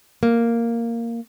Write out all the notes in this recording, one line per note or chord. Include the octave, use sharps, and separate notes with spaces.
A#3